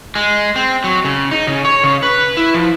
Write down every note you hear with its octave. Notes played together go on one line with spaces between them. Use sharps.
G#3
C4
F#3
C#3
D#4
C#3
C#5
C#3
B4
E4
F3